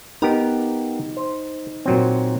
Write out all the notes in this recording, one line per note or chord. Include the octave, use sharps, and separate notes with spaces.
B3 D#4 G4 A#4
C5
A#2 F#3 C4